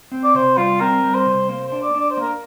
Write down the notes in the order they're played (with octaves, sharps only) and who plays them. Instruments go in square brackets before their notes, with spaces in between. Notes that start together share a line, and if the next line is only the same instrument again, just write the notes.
[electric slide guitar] C4
[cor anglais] D5
[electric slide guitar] C3 [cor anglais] C5
[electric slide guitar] G3 [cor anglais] F4
[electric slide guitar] C4 [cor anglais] A#4
[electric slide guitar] G3
[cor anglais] C5
[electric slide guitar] C3
[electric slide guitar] A#3 [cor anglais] C5
[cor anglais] C5
[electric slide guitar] D4
[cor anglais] D5
[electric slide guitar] D4
[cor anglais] D5
C5
[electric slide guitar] A#3 [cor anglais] A#4